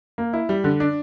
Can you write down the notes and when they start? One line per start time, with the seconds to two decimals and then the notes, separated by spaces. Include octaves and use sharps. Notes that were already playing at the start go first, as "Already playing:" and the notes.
0.18 A#3
0.33 E4
0.49 G3
0.64 D3
0.80 D4